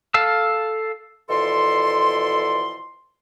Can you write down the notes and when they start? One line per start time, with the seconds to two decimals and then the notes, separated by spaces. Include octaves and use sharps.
0.14 A4 F5 A5 E6
1.29 B2 E3 F3 A4 D5 C6